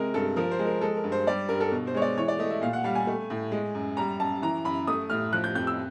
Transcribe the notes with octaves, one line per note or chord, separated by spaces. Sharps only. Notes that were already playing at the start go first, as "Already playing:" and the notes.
Already playing: C3 G#3 A#4
G2 A4
F3 A#4
C5
G#3
A#4
G#3 A4
A#4
G2
C5
G3 D5
G2 A#4
A4
B2
C5
G#3 C#5
D5
E3 C#5
D5
A3 D#5
E5
A#2 F5
F#5
G3 F5
G#5
A3
A2
G#3
F#2
G3 A#5
F#2 A5
E3 A#5
F#2 B5
A3 D#6
A2 F6
F3 F#6
G6
F2 G6
E6